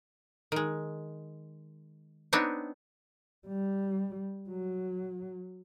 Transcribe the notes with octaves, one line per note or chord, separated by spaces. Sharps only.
D#3 G#3
B3 C4 D4 D#4 C#5
G3
F#3